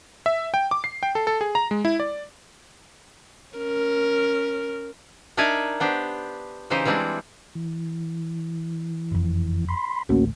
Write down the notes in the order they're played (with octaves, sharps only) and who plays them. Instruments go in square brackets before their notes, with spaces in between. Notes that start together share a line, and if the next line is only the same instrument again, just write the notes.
[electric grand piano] E5
G5
D6
C7
G5
A4
A4
G#4
A#5
G#3
E4
D5
[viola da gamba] C#4 A#4
[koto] D4 D#4 A#4 D5 E5 G#5
B3 D4 G4 C5
C#3 E3 D#4 G4 C5
E3 G3 G#3 C4 D4
[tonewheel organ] E3
[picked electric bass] F#1 F2
[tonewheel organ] B5 C6
[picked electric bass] A1 D2 A3 [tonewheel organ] A#3 C#4 F#4